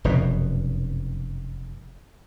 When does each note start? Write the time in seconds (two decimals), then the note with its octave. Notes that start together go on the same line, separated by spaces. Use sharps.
0.04 F1 F#2 B2